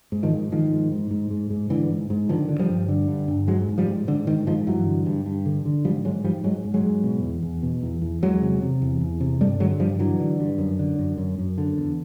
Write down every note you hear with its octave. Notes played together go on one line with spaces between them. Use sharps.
G#2
D#3 F3
G#2
G#2 D#3 F3
G#2
G#2
G#2
G#2
G#2
G#2 D3 E3
G#2
G#2
D3 D#3 F3
D3
F3 G3
G2
D3
G2
G2
G#2 F#3 G#3
G#2
F3 G3
G#2
G#2 D3
G#2 D#3
G#2 D#3 F3
G2 E3 F#3
D3
G2
G2
D3
D3
G#2 F3 G3
G#2 F#3 G#3
G#2 F3 G3
G#2 F#3 G#3
G#2
F#3 G#3
G#2
B2
E2
E2
B2
E2
E2
E2 F#3 G#3
C3
C3
E2
E2
C3
G2 G3 A3
D3 F#3 G#3
G2 F3 G3
D3 E3 F#3
D3
G2
F#2
D3
F#2
F#2
F#2
D3
E2